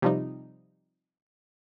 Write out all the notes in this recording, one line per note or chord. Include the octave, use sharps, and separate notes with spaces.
C3 F3 G3 D#4